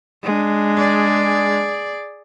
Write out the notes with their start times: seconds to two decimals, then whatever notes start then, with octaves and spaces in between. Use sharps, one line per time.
0.24 G#3 D4
0.77 G#4 D5